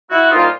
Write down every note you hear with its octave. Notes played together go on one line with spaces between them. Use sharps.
E4 F#4
C2 A#2 G3 A#3 D#4 F4